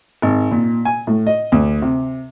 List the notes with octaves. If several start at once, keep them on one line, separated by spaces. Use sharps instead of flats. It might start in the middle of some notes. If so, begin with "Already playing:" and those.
G#1
A#2
G#5
A2
D#5
D2
C3